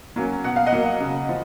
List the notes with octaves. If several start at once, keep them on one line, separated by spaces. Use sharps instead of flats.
F#3 A#3 C#4
B2 F#5
F5
D#5 F#5
F#3 A#3
C#3
F3